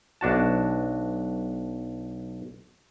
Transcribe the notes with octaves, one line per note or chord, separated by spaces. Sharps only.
B1 D4 F#4 A5